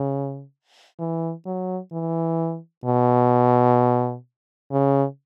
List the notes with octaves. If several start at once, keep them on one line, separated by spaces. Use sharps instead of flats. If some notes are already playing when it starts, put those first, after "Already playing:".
Already playing: C#3
E3
F#3
E3
B2
C#3